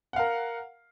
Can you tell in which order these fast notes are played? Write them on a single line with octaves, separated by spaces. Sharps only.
F#5 F5 A#4